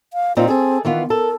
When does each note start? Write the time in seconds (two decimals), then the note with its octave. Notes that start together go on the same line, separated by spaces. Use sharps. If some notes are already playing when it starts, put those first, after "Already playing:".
0.13 F5
0.37 A#2 C4 D#4 F4
0.48 C4 G#4 A4
0.85 D#3 E3 B3 F4
1.10 A4 A#4